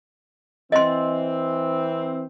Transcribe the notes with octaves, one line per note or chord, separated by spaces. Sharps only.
E3 C4 D#5 C6